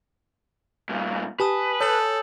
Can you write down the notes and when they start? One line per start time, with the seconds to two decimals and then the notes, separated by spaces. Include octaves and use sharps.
0.89 G2 A#2
1.40 G4 B4 G#5 A5 D#6
1.81 A4 C#5 D#6 G6 F#7